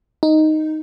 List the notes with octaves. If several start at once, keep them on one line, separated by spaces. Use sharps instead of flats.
D#4